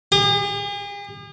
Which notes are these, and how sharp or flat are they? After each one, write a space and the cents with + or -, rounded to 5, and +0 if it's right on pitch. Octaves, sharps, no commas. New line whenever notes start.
G#4 -45